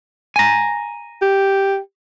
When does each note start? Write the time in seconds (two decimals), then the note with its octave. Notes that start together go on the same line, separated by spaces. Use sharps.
0.36 G#5 A#5
1.22 G4